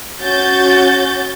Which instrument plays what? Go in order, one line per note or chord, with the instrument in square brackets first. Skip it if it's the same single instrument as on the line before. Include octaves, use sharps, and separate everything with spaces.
[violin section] C#4 F#4 G6 A6